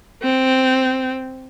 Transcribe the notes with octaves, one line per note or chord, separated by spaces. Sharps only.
C4